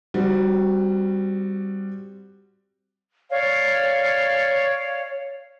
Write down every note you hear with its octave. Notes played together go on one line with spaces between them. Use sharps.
G3 C4 F#4
C#5 D5 F5